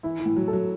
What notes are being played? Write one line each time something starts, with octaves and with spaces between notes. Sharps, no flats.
E3 E4
E3
A2
F#3
A4
F#3